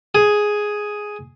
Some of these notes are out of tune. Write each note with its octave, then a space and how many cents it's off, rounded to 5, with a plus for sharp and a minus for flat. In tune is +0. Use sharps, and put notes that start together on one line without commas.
G#4 +5